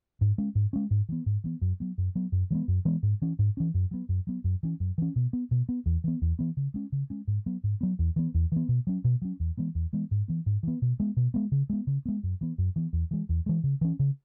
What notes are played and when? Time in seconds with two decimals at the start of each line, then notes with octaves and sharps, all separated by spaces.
0.21 G#2
0.38 G#3 C#4
0.55 G#2
0.73 G#3 C#4
0.91 G#2
1.09 E3 B3
1.26 G#2
1.44 E3 B3
1.62 F#2
1.80 F#3 B3
1.98 F#2
2.15 F#3 B3
2.32 F#2
2.51 E3 G#3 B3
2.68 F#2
2.85 E3 G#3 B3
3.03 G#2
3.22 E3 C#4
3.39 G#2
3.57 E3 C#4
3.74 F#2
3.91 F#3 B3
4.09 F#2
4.27 F#3 B3
4.44 F#2
4.63 E3 C#4
4.80 F#2
4.98 E3 C#4
5.16 B2
5.33 B3
5.51 B2
5.69 B3
5.86 E2
6.04 E3 B3
6.22 E2
6.39 E3 B3
6.57 C#3
6.74 G#3 C#4
6.92 C#3
7.10 G#3 C#4
7.28 G#2
7.46 F#3 B3
7.64 G#2
7.81 F#3 B3
7.99 E2
8.16 E3 B3
8.34 E2
8.52 E3 B3
8.69 B2
8.87 F#3 C#4
9.04 B2
9.22 F#3 C#4
9.40 E2
9.57 E3 G#3 B3
9.75 E2
9.93 E3 G#3 B3
10.11 G#2
10.28 E3 B3
10.46 G#2
10.63 E3 B3
10.82 B2
11.00 G#3 B3
11.17 B2
11.34 G#3 B3
11.52 C#3
11.70 G#3 B3
11.87 C#3
12.06 G#3 B3
12.23 F#2
12.41 E3 B3
12.58 F#2
12.76 E3 B3
12.93 E2
13.11 E3 G#3
13.29 E2
13.46 E3 G#3
13.64 C#3
13.81 E3 C#4
13.99 C#3